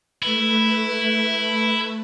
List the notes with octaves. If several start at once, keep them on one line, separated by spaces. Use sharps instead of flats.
A3 E4 B4